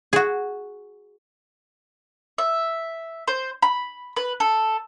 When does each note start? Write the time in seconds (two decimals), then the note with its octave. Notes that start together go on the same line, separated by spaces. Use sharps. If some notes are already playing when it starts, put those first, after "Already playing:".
0.13 F#4 G#4
2.38 E5
3.28 C5
3.62 B5
4.16 B4
4.40 A4